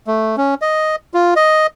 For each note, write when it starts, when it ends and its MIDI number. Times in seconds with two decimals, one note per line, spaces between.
0.07 0.36 57
0.37 0.55 61
0.62 0.96 75
1.14 1.34 65
1.36 1.67 75